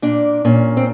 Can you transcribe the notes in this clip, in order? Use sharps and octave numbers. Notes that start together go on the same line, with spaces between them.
A#2 D4
A#2 C#4
C4